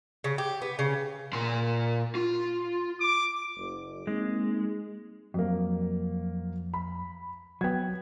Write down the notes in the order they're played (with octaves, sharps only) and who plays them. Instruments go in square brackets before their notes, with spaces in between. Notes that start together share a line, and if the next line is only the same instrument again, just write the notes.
[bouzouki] C#3
G4
B3
C#3
[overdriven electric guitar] A#2 C6
F4
[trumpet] D6
[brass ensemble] F#1
[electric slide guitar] G#3 [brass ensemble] A#3 C4 D#4
[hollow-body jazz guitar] F2 [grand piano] F#3 A#3
[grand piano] B5
[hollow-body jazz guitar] F#3 B3 [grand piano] G5 G#6